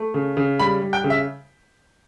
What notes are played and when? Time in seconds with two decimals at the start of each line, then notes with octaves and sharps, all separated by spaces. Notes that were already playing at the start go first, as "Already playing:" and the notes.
Already playing: A3
0.14 C#3
0.37 C#3
0.60 G3 B5
0.82 G3
0.93 G5
1.04 C#3
1.10 E5